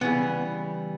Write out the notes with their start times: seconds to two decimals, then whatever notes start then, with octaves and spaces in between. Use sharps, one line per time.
0.01 C#3 E3 G3 B3